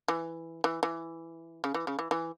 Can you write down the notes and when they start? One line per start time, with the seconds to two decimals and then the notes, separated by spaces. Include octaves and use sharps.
0.08 E3
0.64 E3
0.83 E3
1.64 C#3
1.74 E3
1.87 C#3
1.99 E3
2.11 E3